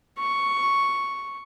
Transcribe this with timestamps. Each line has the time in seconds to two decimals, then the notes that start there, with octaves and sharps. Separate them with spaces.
0.18 C#6